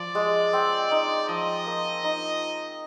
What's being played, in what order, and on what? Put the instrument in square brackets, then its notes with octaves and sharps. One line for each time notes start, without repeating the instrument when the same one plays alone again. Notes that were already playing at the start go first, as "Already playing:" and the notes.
Already playing: [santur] F3 [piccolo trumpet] D5
[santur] G#3
C4
D#4
[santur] F3 [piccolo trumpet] D#5
[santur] A#3
D#4